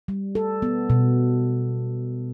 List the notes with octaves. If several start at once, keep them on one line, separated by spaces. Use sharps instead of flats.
G3
A4
B3
B2